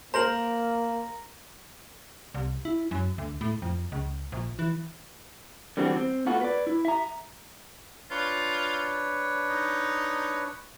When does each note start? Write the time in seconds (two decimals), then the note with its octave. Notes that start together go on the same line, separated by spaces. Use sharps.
0.14 A#3 A#4 C5 A#5 A#6 F#7
2.34 C2
2.65 E4
2.91 F#2
3.18 D2
3.41 A2
3.62 F2
3.92 C#2
4.32 A#1
4.59 E3
5.77 D3 E3 G3 C4 D4 F#4
5.97 C4
6.27 A3 B3 F4 F#4 A4 F#5
6.41 B4 D5
6.67 E4
6.85 E5 A#5
8.11 D4 F4 B4 C#5
9.49 D#4